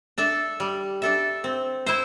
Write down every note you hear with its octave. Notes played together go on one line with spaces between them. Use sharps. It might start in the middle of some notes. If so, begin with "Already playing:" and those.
D4 A4 E5
G3
D4 A4 E5
C4
E4 C5 E5